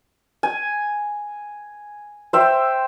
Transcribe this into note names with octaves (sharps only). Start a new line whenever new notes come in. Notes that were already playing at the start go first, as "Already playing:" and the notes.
G#5
C5 E5 G5